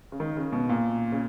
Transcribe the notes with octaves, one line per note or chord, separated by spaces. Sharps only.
C#3
D#3
C#3
B2
A#2
C#3